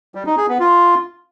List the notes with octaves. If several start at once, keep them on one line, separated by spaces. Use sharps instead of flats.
G3
D#4
G#4
B3
F4